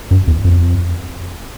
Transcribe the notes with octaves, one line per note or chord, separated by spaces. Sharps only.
F#2
E2
F2